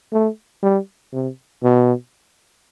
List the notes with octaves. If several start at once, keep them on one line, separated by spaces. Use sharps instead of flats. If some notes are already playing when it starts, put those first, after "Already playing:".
A3
G3
C3
B2